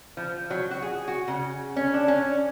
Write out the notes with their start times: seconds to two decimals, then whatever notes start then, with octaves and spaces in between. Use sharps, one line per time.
0.17 F3
0.51 F#3
0.71 F#4
0.82 G#4
1.08 F#4
1.28 C#3
1.77 C#4
1.94 D4
2.08 C#4